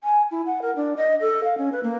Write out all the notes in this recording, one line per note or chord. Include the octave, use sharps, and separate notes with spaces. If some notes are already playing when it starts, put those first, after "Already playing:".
G#5
E4
F#5
A#4
D4
D#5
A4
F5
C#4
B4
A#3